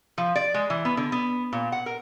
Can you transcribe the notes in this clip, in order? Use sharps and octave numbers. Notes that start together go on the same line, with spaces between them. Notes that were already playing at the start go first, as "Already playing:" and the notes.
F3
D5
G#3
E3
B3
D3
B3
A#2
F#5
A#4